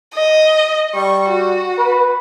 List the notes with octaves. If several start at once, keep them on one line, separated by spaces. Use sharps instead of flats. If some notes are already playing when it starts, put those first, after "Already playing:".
D#5
G3 C#6
F#4
B4